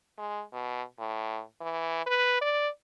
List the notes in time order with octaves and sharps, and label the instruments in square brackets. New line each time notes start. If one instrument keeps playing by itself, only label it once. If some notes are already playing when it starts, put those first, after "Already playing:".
[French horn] G#3
B2
A2
E3
B4
D5